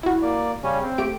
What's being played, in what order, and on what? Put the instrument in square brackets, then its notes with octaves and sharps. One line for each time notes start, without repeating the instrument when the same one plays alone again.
[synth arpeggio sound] E4 F#4
[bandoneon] A#3 D5
C#3 G3 C#4
C4
[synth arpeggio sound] A3 G4 D7